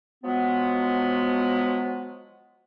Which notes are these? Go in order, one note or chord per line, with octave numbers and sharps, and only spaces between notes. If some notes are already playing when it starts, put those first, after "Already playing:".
F3 F#3 G#3 B3